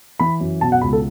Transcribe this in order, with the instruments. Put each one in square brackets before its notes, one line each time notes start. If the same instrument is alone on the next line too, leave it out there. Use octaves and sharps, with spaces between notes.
[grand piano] E3 B5
F#2
B2 A5
F#5
C#2 B5
A4